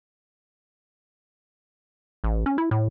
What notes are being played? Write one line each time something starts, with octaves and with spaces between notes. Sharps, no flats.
A1
C#4
E4
A2